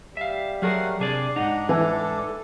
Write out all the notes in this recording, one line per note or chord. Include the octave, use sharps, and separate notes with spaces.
G3 E5 F5
F#3 A3 G#4 A#4 F5 F#5
C3 D4 G#4 D5
G#2 C3 D#4 F#5
E3 A4